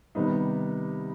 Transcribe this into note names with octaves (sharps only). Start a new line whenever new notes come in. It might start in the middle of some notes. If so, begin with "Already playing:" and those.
C3 D#3 G3 B3 D#4